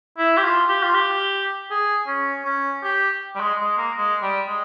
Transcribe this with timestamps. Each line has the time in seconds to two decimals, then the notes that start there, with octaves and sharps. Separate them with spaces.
0.18 E4
0.37 G4
0.45 F4
0.69 G4
0.83 F4
0.94 G4
1.71 G#4
2.07 C#4
2.45 C#4
2.84 G4
3.35 G3
3.40 G#3
3.60 G#3
3.78 A#3
3.97 G#3
4.22 G3
4.47 G#3